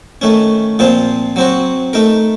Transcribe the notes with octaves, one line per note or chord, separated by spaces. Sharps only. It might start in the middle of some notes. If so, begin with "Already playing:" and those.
D#3 A3 C#4
A#2 F3 C4 F4
F#3 C4 F#4
A3 D#4 A#4